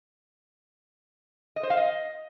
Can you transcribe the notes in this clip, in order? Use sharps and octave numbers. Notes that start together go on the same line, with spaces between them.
D#5
C5
F5
D#5